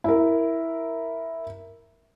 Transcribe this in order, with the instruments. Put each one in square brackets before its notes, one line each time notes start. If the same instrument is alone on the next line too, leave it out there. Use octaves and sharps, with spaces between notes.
[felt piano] E4 A#4